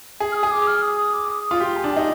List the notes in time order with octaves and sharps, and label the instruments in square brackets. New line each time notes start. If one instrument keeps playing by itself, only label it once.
[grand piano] G#4
[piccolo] F6
D#6
[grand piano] G#4
[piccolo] D6
F6
D#6
D#6
D6
D#6
D#6
[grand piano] F4
[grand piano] G4 [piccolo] C6
[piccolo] G#5
[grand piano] D4
[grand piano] D#4 [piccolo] G5